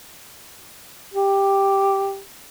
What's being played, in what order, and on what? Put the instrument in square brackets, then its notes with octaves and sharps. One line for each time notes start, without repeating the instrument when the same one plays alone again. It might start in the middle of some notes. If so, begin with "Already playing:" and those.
[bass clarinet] G4